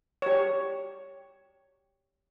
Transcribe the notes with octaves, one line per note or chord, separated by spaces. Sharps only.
G4 C#5